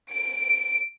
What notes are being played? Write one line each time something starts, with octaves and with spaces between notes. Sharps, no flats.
D7